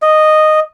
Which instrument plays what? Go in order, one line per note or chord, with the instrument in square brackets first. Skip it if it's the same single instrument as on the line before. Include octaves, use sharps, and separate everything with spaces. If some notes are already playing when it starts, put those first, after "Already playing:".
[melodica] D#5